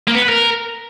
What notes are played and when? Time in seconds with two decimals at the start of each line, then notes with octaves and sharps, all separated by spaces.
0.08 A#3
0.15 B3
0.22 B4
0.29 A#4